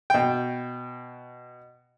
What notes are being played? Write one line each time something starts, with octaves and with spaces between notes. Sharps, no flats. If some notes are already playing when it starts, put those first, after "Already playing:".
B2 G5